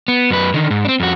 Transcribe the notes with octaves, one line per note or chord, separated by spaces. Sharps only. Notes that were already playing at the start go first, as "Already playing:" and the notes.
B3
F#2 B4
D3 D#3
G#2
C4 D4
F2 F#4